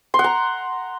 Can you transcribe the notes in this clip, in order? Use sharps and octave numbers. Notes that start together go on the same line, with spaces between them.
C6
F#5
A#5